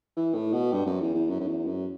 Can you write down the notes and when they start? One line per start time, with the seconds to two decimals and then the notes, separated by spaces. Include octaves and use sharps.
0.17 E3
0.34 A2
0.53 B2
0.72 G2
0.86 F#2
1.00 E2
1.14 E2
1.29 F#2
1.40 F#2
1.47 E2
1.66 F#2